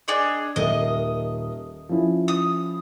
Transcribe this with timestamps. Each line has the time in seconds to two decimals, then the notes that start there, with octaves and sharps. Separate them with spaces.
0.08 D4 G#4 D#5
0.56 D#1 A#4 D#5 E5
1.89 F3 C#4 E4
2.28 D#6